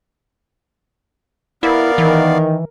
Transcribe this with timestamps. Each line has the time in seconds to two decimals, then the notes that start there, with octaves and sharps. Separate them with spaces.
1.63 B3 E4 A#4 D5 F5
1.98 D#3 E3